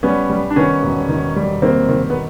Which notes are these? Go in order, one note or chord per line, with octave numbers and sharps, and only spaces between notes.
G3 B3 C#4
G3
D4
D#3 B3 C#4
E1
D#3
G3
D#3 A#3 C4
D#3
B3